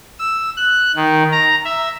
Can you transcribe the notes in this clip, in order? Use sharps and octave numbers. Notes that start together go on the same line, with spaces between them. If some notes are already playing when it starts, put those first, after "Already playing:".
E6
F#6
D#3
A#5
E5